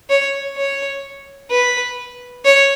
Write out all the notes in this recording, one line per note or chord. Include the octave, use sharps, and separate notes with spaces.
C#5
C#5
B4
C#5